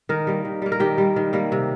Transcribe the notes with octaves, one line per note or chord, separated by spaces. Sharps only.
D#3 A#4
G3 A#3
D#3
G3 A#3
A#4
D#3 G4
G3 A#3
D#3
G3 A#3
C3